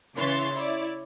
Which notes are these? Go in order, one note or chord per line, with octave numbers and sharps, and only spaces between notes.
C#3 E3 C#5 E5 C6 A6
E4 C#5 D5